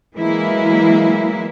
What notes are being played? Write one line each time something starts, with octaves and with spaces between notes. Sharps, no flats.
E3 F#3 G#3 A#3 E4